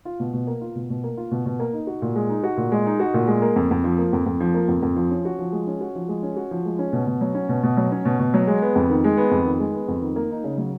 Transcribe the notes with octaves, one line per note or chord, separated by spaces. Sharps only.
F4
B2
B2
A#3
F4
B2
B2
A#3
F4
B2
B2
A#3
D#4
F#4
A#2
G#3
D#4
F#4
A#2
G#3
D#4
F#4
A#2
G#3
A#3
F2
F2
F3
A#3
F2
F2
F3
A#3
F2
F2
F3
C#4
F#4
F3
G#3
C#4
F#4
F3
G#3
C#4
F#4
F3
G#3
C#4
B2
B2
F#3
C#4
B2
B2
F#3
C#4
B2
B2
F#3
G#3
B3
F2
D#3
G#3
B3
F2
D#3
G#3
B3
F2
D#3
A#3
D#4
C#3
F#3